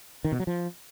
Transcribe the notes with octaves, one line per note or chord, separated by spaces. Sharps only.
D#3
B2
F#3
F3